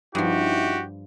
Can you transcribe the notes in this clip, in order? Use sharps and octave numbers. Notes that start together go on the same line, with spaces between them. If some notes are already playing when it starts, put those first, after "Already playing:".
G2 F3 C#4 D#4 E4 F#4 G4